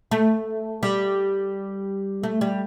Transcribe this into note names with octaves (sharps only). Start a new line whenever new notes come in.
A3
G3
A3
G3